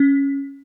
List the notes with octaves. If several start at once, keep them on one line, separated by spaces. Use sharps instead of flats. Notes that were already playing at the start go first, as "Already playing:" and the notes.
Already playing: C#4